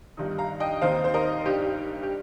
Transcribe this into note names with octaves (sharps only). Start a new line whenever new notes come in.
G1 G2 D#3 G3 D#4
F5 A#5
D#5 G5
D#2 D#3 C4 D#4 C5 F5
C5
A#4 D#5
G2 G3 D#4 G4
G4
G4